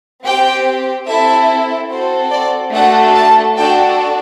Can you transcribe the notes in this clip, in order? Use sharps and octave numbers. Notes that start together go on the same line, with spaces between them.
C4 G4 G5
C4 E4 A4 E5
C4 F#4 A4 C5
D5
A3 D4 F#4 A4 F#5
A5
D4 F#4 A4 G5